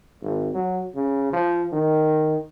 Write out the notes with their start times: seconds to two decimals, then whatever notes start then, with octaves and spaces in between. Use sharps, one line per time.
0.22 G#1
0.54 F#3
0.95 C#3
1.33 F3
1.73 D#3